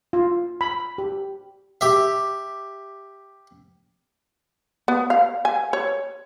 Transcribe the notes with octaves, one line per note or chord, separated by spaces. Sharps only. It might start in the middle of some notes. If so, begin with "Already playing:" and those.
F4
B5
G4
G4 E5
B3
F5
G#5
C#5